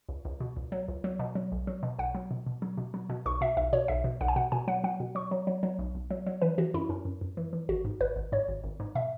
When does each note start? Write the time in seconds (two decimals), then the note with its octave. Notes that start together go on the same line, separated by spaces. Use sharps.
0.09 C#2
0.25 C#2
0.40 B2
0.57 C#2
0.72 F#3
0.88 C#2
1.04 F#3
1.19 B2
1.35 F#3
1.52 B1
1.67 F#3
1.83 B2
1.99 B1 F#5
2.15 F#3
2.31 B2
2.46 B2
2.62 F#3
2.78 B2
2.94 F#3
3.09 B2
3.26 B1 C#6
3.41 B2 E5
3.57 B1 E5
3.73 B2 C#5
3.88 B1 E5
4.04 B2
4.21 B1 F#5
4.28 G#5
4.36 B2 F#5
4.52 B2 G#5
4.68 F#3 F#5
4.84 F#3 F#5
5.00 B2
5.15 F#3 C#6
5.31 F#3
5.47 F#3
5.63 F#3
5.79 B1
5.95 B1
6.11 F#3
6.27 F#3
6.42 E3 B4
6.58 E3 F#4
6.74 F#2 E4
6.89 F#2 C#4
7.05 F#2
7.21 F#2
7.37 E3
7.53 E3
7.69 G#1 F#4
7.85 G#2
8.00 G#1 B4
8.16 G#1
8.32 G#2 C#5
8.48 G#1
8.64 G#1
8.80 G#2
8.95 B2 E5